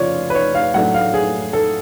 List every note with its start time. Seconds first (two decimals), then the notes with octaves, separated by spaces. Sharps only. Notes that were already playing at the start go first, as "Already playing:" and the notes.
Already playing: C#3 F3 F4 C#5 D5
0.30 B4
0.35 C#5
0.55 F5
0.74 A2 F#3 A3 D4 F#5
0.94 F5
1.14 G#4
1.53 A4